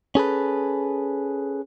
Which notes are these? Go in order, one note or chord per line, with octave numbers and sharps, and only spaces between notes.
C#4 G#4 A4 B4